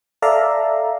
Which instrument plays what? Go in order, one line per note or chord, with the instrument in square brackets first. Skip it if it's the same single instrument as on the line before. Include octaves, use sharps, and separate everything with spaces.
[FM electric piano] A4 D5 E5 F5 A#5